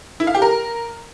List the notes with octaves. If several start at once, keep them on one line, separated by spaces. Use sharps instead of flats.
E4
F5
G4
A#4